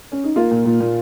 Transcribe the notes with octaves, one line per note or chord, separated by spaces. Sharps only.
C#4
D#4
A#3 F4
A#2
A#2
A#2